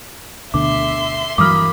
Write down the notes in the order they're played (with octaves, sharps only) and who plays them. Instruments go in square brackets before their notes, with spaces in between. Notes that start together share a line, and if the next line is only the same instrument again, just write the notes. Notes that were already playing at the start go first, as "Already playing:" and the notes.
[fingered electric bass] D2 B2 D3 [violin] E5 C6 [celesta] D6
[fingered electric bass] G2 E3 F#3 [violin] A#3 B5 [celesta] D6 D#6 F6